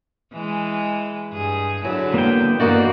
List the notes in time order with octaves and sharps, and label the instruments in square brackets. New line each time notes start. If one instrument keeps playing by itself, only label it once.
[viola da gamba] E3 G#3
G2 G#4
[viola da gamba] D3 E4 [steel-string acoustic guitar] F#3
[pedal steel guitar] A#3 B3 G5
[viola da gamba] G2 D3 E3 [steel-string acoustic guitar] A#3 D#4 F#4 [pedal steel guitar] D5